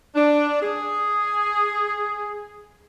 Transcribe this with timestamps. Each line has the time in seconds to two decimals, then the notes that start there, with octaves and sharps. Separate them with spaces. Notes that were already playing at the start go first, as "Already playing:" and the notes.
0.16 D4
0.62 G#4